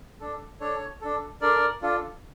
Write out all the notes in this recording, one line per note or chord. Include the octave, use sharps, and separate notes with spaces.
D4 A4
D4 A4 C#5
D4 A4
D4 A4 A#4 D5
D4 F4 A4